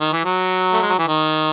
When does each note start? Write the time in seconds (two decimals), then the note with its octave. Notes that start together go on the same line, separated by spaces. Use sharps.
0.01 D#3
0.13 E3
0.25 F#3
0.73 A3
0.82 G#3
0.90 F#3
0.99 E3
1.08 D#3